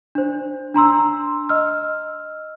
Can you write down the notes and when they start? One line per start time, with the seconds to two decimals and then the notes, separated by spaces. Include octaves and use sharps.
0.15 D4 C5
0.74 D4 A#5 C6 E6
1.49 D#5 E6 F6